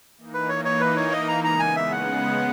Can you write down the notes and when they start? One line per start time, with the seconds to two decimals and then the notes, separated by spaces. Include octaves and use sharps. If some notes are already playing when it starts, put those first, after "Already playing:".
0.18 E3 A#3 D#4
0.34 B4
0.49 C#5
0.65 C#5
0.80 B4
0.97 C#5
1.12 D#5
1.28 A#5
1.44 C#3 G#3 B3 A#5
1.59 G#5
1.76 E5
1.92 F#5